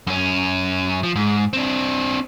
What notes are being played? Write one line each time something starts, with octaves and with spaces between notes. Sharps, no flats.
F#2 C#4
F3
G#2
C4 D4